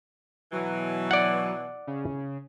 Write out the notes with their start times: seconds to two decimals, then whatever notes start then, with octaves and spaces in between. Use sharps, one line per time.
0.53 B2 E3 F#3
1.11 D5 F#5
1.87 C#3